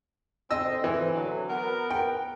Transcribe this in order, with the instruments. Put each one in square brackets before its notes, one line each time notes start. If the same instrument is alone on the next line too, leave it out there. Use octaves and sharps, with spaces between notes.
[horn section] D3 C4 [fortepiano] D#5 E6
[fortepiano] E3
[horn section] D3 F#3
B3 A#4 F#5
[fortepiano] G5